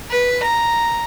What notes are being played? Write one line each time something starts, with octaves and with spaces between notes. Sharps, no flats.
B4
A#5